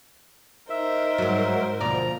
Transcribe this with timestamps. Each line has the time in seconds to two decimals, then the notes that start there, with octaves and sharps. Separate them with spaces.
0.70 D#4 A#4 C5 D#5 E5
1.18 G#2 F#3
1.81 D2 B2 F3 A#3 D5 A#5